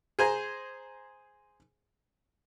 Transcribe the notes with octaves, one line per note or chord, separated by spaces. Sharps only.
G#4 C5 G#5 A#5